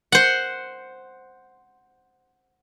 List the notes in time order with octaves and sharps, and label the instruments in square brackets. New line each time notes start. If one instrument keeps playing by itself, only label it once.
[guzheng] C5 F#5